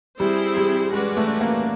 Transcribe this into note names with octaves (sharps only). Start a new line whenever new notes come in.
G3 C4 E4 G#4 C5
G3
G#3 C#4 F#4 B4 D5
A3
A#3